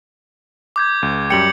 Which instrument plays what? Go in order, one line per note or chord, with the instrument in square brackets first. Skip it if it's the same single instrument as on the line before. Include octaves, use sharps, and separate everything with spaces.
[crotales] D6 G6 G#6
[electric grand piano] C#2
[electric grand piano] F#2 G3 G5 [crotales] C#7 F#7